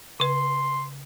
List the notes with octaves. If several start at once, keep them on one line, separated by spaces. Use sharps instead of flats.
C#3 B4 C6